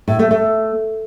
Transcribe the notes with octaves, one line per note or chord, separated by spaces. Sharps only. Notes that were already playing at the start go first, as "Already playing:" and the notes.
A2
A3
A3